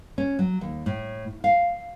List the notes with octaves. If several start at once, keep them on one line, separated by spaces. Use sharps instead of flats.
C#4
F#3
D#2
A2
F5